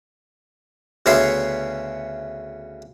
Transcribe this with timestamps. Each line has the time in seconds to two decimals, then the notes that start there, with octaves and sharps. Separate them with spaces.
1.06 D2 C#3 B3 C#4 E5 C6